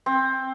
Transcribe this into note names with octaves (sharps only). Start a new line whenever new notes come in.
C4